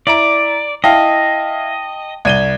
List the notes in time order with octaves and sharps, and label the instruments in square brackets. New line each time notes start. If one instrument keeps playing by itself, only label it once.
[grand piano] E4 A#5 D7 [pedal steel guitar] D5
[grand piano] E4 F5 [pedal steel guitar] D#5 [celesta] G5 A5
[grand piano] C2 D#7 G7 [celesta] D5 G#6